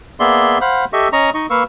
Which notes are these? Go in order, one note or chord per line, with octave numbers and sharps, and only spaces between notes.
A#3 B3 G#4 D5 E5 C6
C5 F5 F#5 B5
G4 A4 D#5 E5 C#6
C#4 D#5 A#5 C#6
D#4 D#5 C#6
A#3 B4 F5 C#6 E6